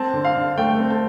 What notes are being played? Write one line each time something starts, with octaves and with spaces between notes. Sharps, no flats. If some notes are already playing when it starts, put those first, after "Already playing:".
Already playing: C4 A5
D3
F5
D3
A3 G5
C4
A5